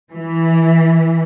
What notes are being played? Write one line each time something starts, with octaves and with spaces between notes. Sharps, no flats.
E3